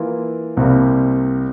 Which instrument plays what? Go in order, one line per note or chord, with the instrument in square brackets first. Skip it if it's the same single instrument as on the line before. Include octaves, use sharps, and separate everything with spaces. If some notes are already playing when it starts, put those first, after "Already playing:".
Already playing: [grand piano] E3 A#3 F4
C2 C3 G3 A#3